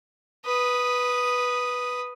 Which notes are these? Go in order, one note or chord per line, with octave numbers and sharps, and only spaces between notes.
B4 D#6